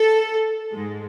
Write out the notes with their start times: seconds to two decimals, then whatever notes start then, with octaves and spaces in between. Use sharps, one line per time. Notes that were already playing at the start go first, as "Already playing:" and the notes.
Already playing: A4
0.72 G#2 G#3